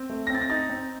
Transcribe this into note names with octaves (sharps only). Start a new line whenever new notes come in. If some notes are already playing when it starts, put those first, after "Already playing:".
Already playing: C4
A3
A#6
C4 A6
A#6
D#4 A6
C4